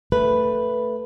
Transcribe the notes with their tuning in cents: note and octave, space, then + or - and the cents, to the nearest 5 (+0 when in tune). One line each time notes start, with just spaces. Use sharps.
A3 +15 B4 +0